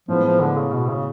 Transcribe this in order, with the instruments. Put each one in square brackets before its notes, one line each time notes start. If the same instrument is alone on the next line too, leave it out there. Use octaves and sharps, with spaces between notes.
[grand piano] A2 G#3 B3 [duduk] F3
[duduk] F3
D3
C#3
B2
C#3